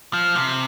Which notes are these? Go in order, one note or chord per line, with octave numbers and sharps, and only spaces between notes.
F3
C3